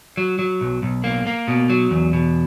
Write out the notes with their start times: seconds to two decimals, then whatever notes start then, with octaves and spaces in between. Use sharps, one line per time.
0.17 F#3
0.39 F#3
0.61 B1
0.83 B1
1.04 A#3
1.27 A#3
1.48 B2
1.70 F#3
1.91 E2
2.13 B2